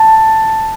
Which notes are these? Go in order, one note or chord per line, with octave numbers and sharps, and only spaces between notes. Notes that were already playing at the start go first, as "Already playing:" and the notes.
Already playing: A5